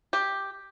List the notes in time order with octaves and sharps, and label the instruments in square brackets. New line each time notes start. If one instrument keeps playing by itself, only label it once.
[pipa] G4